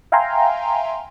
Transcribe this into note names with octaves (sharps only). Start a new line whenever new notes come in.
E5 F5 G5 G#5 A#5 C6